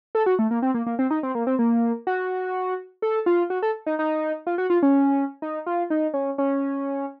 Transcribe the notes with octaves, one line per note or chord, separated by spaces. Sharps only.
A4
F#4
A3
A#3
C4
A#3
A#3
C4
D#4
C4
A#3
C4
A#3
F#4
A4
F4
F#4
A4
D#4
D#4
F4
F#4
F4
C#4
D#4
F4
D#4
C#4
C#4